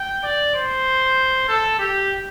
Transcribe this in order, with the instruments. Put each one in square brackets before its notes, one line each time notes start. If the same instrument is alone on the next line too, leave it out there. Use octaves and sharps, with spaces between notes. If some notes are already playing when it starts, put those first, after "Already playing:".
Already playing: [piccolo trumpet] G5
D5
C5
A4
G4